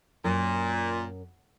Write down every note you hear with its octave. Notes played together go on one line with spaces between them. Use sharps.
F#2 A#2